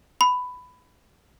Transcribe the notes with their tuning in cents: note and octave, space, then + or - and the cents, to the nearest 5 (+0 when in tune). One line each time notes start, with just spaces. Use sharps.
B5 +15